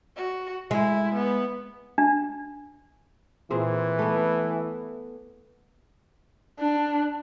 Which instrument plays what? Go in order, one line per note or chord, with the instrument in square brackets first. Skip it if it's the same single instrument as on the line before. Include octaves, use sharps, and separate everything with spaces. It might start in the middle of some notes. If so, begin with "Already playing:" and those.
[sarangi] F#4
[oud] G#3 [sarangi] E4
[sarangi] B3
[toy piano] D4
[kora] A#2 C4 G#4 [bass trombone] E3
[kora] A3 B3
[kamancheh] D4